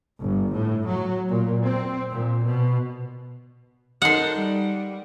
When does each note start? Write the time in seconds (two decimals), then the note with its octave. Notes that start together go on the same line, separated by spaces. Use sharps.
0.20 G1
0.53 A2
0.87 F#3
1.28 A#2
1.64 C4
2.11 A#2
2.44 B2
4.02 D#4 A4 A#4 F#5 C6
4.36 G3